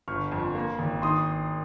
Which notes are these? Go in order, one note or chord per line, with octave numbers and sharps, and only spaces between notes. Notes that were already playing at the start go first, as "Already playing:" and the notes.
G1 C#6 F6
F2
A#3
G#1
D#3 C6 D#6